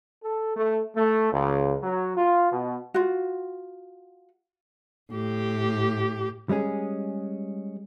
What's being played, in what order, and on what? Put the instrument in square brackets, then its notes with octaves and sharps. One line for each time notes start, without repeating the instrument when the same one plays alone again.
[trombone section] A4
A3
A3
C#2
F#3
F4
B2
[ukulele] F4 F#4
[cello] A2 G4
[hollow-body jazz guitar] G3 G#3 C#4 G#4